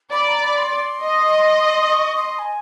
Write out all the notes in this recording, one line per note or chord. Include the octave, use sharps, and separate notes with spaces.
D5 B5
A#5
B5
C6
D#5
C#6
C6
G#5